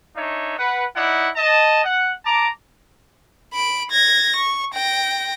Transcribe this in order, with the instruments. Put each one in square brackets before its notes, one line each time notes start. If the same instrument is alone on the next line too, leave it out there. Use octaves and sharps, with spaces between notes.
[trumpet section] D4 D#4 C#5 E5
B4 F#5
D#4 E4 D5 F#5
D#5 A5
F#5
A5 A#5 D6
[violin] B5 D7
G#6 A#6
C#6
G5 A#6